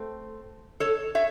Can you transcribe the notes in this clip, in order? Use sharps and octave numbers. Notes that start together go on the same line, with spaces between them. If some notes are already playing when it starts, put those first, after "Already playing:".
Already playing: A3 C4
A4 C#5
C#5 E5